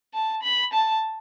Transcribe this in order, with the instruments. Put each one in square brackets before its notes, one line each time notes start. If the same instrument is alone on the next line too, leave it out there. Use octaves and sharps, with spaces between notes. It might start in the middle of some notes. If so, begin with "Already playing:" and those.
[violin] A5
B5
A5